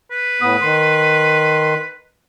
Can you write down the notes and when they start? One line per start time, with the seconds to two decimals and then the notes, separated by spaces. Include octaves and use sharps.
0.11 B4
0.42 A2 B3 D#6
0.62 D#3 C6